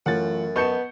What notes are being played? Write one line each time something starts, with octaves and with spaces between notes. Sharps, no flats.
F#2 E3 A3 F4 F#5 A6
B3 D#5 A5 C#6 G6 C#7 E7